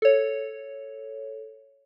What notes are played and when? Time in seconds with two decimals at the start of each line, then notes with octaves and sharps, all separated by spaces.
0.02 A4 C#5